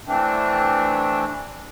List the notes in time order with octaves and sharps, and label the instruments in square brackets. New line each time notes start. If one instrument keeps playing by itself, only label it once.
[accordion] E3 A3 C4 D4